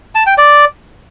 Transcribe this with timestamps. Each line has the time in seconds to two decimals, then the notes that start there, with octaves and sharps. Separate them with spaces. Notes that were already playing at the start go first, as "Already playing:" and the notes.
0.15 A5
0.26 G5
0.38 D5